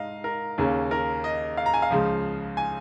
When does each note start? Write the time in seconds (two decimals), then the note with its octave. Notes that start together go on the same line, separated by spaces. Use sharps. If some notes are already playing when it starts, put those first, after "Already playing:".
Already playing: G#2 D#5 F5
0.24 A#4
0.58 D#2 C#3 A#3 C#4
0.91 A#4
1.24 D#5
1.57 F5
1.66 A#5
1.74 G#5
1.82 F5
1.91 C#2 C#3 F3
2.57 G#5